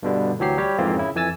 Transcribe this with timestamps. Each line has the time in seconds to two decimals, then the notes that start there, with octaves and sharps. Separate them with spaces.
0.03 G2 B2 D3 G3
0.39 D2 E3 F#3 G4 C7
0.58 G3 G4 C#5
0.78 F2 G#2 E3 A#3 C4 F4
0.96 C#3 E4
1.15 F2 E3 G#5 E6 A6